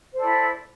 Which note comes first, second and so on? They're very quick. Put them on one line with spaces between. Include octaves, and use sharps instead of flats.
C5 A4 D5 E4